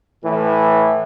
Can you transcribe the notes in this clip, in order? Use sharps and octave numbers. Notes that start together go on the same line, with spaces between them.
A2 E3